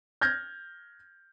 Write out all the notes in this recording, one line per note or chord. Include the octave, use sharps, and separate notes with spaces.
F6 G6 G#6 A#6